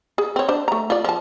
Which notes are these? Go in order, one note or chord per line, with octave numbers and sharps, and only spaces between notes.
G#4
C4 C#5
D4 C5
A3 A#5
F4 D5
F3 A5